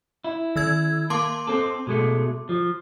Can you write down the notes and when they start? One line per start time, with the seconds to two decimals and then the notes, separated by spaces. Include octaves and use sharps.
0.24 E4
0.56 D#3 E6 G#6
1.10 A#3 A5 C6 D6
1.47 C4 A4
1.87 B2 G#3 A3
2.49 F3